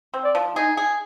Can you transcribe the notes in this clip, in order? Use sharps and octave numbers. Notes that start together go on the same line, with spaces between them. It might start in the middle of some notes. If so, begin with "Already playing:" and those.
C4
D5
F3
D#4 G#4
G#4